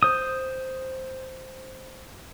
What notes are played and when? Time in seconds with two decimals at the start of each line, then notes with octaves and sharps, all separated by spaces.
0.03 C5 D#6